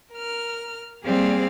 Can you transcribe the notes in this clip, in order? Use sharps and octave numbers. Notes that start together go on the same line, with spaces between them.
A#4 F6
G3 A#3 C4 G#4 D5 F5